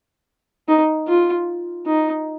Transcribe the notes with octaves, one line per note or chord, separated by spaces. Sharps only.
D#4
F4
D#4